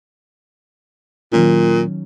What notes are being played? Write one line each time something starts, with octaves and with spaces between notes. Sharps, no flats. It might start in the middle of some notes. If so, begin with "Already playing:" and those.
A#2 D#3 F#3 C#4